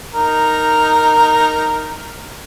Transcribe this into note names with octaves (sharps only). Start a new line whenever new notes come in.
D#4 A#4